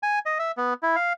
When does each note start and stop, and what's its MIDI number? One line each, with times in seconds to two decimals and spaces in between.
0.03 0.19 80
0.26 0.38 75
0.39 0.52 76
0.57 0.74 59
0.83 0.96 64
0.96 1.13 77